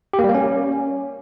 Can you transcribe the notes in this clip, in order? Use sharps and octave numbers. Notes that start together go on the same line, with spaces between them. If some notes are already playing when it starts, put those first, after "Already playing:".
G4
A#3
G3
A#3
C#4